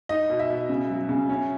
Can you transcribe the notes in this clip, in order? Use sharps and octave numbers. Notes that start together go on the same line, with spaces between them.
D#4 D#5
B2
E5
B2
C#3
F#3
C#3
C#4